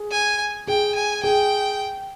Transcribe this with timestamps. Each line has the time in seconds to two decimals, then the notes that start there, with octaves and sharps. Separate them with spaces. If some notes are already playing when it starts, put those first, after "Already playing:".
Already playing: G#4
0.11 G#5
0.67 G#4 G5
0.95 G#5
1.23 G#4 G5